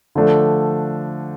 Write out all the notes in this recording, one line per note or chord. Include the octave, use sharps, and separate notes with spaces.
D3 F3 A3 D4